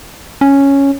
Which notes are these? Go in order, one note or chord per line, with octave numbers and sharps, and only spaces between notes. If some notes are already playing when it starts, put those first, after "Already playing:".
C#4